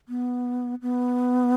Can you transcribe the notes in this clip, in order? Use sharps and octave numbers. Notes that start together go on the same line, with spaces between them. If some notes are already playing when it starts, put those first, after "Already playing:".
B3
B3